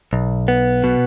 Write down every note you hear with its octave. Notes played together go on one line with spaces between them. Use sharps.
B1
B3
B2